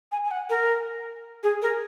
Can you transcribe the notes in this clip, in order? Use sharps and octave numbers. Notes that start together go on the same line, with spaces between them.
G#5
G#5
F#5
A#4
G#4
A#4